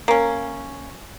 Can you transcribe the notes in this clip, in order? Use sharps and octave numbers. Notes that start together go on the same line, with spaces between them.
A#3 C#4